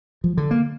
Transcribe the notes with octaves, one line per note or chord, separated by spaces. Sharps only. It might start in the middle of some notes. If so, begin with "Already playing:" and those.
F3
D3
A#3